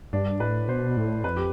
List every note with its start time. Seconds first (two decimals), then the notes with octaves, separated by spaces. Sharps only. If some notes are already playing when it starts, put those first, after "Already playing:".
0.13 G2 D4
0.40 A2 B4
0.68 B2 C5
0.97 A2
1.24 F2 B4
1.37 G4